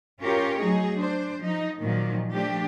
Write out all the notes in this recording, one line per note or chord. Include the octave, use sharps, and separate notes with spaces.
C#4 F4 G4 A#4 C#5
F#3 A3 D#4 G#4
D4 C5
F3 D#4
A#2 D#3 F3 F#3 A#3
F3 A3 D4 G4